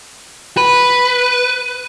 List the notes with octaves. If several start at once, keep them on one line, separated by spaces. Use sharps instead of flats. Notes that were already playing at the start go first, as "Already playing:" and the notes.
B4